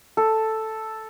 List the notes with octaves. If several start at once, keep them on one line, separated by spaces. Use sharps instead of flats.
A4